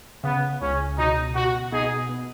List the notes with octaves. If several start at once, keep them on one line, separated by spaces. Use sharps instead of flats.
C#3 B3
C#2 C#4
B2 D#4
B2 F#4
B3 D#4 G#4
B3